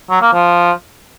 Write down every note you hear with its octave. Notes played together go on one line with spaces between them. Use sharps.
F#3
A#3
F3